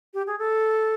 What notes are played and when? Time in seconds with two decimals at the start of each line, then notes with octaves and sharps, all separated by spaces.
0.14 G4
0.27 G#4
0.39 A4